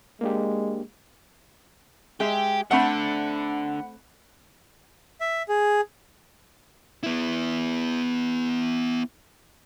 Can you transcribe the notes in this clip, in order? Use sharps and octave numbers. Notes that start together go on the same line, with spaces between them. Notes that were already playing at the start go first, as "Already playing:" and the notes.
G#3 A#3 D4 G4
G#3 G4 G#4 E5
D3 A3 C4 E5 F#5 B5
E5
G#4
B3 E4